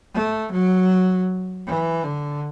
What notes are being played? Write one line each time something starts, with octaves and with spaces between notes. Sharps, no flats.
A3
F#3
E3
D3